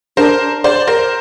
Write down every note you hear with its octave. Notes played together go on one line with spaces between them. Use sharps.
D4 A#4 C5
C5 D5
A#4 C5